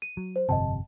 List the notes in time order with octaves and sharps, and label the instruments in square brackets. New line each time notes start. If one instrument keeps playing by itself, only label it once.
[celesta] D#7
[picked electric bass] F#3
[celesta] C5
[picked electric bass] G1 F2 C3 [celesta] D#5 G5 A5